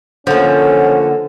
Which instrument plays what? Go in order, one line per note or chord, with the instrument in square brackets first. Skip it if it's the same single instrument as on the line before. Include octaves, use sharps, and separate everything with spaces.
[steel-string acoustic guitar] D3 A#3 [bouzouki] F3 [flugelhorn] C#4 [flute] F#5